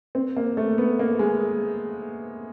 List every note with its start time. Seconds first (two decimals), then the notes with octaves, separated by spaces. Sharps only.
0.15 C4
0.36 A#3
0.57 A3
0.78 B3
0.99 A#3
1.19 G#3